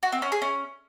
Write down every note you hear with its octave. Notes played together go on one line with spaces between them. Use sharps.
F#4
C4
C#4
G#4
C#4